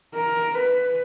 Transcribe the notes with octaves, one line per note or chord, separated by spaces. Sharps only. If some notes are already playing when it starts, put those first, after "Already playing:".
A#4
B4